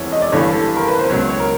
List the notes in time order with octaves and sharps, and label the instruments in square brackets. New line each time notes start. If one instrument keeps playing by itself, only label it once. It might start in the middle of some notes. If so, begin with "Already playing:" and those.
Already playing: [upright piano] F1 E2 C3 E3 C#5
D#5
D5
G1 G2 E3 A3 C#5
A4
A#4
B4
C5
C#2 B2 F#3 C#5
C#5
A#4